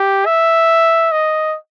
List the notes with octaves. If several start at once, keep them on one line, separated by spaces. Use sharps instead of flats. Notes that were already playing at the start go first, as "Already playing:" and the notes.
Already playing: G4
E5
D#5